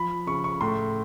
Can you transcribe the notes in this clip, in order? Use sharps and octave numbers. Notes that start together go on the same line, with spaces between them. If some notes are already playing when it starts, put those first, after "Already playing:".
Already playing: F3 B5
C#3 C#6
C#6
A2 C6